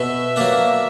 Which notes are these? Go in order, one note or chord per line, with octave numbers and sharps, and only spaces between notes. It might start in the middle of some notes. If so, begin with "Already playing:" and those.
Already playing: B2 E5
F#3 A#3 D4